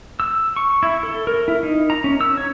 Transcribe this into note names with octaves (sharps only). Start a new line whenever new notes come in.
E6
C#6
E4
A4
A#4
E4
D#4
A#5
C#4
E6
C#5